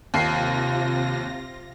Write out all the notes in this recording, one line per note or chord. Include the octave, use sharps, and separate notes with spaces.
D#2 C3 F4 A#6 C7